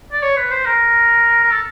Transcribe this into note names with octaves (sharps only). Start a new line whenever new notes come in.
D5
C#5
B4
C5
A#4
A#4
A4